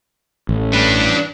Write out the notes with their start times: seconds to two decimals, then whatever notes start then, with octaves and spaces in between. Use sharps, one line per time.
0.49 A1
0.74 D4 B4